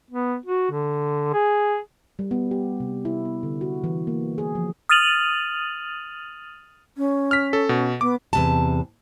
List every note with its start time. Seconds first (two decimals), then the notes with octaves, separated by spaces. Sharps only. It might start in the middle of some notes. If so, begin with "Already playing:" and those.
0.11 B3
0.46 F#4
0.71 D3
1.33 G#4
2.19 G3
2.31 B3
2.51 G4
2.80 C3
3.05 E4
3.25 B3
3.43 D3
3.61 F#4
3.84 E3
4.07 A#3
4.38 G#4
4.55 F3
4.89 D#6 F6 A6 D#7 F7 F#7
6.97 C#4
7.31 F6 B6
7.53 A4
7.69 B2
8.01 B3 D6
8.33 E2 C3 A5